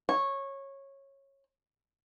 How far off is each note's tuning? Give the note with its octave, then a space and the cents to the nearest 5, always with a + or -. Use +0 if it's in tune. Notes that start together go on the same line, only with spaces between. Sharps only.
C#5 -15